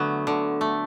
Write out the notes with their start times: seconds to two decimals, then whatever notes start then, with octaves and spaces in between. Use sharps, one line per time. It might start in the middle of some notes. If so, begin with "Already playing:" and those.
Already playing: D3 F#3 A3 B3
0.27 D3
0.61 A3